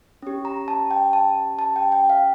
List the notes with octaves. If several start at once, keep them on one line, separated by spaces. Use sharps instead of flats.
C#4 G4
A#5
A5
G5
A5
A5
G5
G5
F5